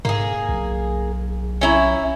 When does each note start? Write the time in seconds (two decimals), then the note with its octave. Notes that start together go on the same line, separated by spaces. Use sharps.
0.05 G#2 A#3 G#4
0.49 B1
1.61 C#4 E4 A#5